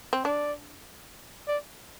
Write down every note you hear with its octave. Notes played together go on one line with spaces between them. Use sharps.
C4
D4 D5
D5